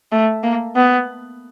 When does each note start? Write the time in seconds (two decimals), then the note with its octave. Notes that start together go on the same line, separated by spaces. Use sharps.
0.12 A3
0.43 A#3
0.76 B3